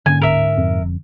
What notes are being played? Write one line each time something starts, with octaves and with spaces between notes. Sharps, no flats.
G#2 D3 A#3 C#4 G#5
D1 A#4 E5
F2
E1